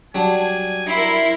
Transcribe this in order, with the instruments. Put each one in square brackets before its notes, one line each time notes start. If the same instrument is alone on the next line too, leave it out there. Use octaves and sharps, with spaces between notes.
[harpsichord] F#3 G3 [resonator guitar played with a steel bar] D4 [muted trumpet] G#5
[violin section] E4 A#4 [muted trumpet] C6